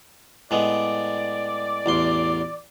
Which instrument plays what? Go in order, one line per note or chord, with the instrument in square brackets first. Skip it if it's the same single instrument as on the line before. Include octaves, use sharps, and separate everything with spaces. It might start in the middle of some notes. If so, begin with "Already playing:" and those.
[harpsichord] A2 G#3 B3 [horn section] D5
[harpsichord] A1 E2 C6